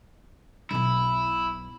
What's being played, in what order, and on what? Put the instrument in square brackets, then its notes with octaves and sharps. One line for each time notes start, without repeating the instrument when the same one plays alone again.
[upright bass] B1 B2 [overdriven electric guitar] E4